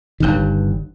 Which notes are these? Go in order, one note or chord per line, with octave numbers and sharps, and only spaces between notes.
G1 G2 D#3